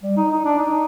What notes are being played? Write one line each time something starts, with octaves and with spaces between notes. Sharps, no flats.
G3
D#4
D#4
D4
D#4